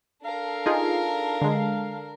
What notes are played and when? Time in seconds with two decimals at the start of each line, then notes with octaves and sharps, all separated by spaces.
0.24 D4 A4 A#4 F5
0.66 D#4 F4 G#4
1.42 D3 G#3